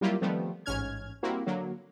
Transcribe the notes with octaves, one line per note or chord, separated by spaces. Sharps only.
F#3 G3 A#3 E4 F4 G4
D#3 F3 G3 A3 B3 C4
A1 G#2 C#4 F6 G#6
G3 A#3 C4 E4 F#4
D3 F#3 A#3